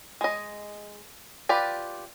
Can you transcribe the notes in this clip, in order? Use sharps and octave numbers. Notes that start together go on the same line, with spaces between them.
G#3 D#5
F4 G4 B4 D5